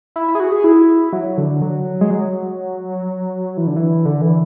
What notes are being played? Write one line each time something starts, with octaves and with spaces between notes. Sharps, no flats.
E4
E4
G#4
F#4
G#4
E4
F#3
D3
F#3
G#3
F#3
E3
D3
E3
D3
E3